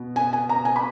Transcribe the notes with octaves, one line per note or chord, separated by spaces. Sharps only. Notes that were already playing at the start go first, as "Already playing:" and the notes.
Already playing: B2
G#5
G#5
A#5
G#5
B5